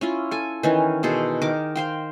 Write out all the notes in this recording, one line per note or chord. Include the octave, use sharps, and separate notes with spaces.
C#4 E4 F4
A4 G#5
D#3 E3 C#4
B2 G#4 A4 C5
D#3 A#4 D6
C5 F5 G5